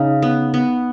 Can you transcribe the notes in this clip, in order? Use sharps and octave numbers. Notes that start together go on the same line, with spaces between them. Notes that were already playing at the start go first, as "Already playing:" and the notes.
Already playing: C#3 D#4
B3
B3